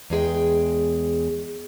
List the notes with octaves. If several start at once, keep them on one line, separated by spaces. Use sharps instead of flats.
E2 G#3 G#4 G5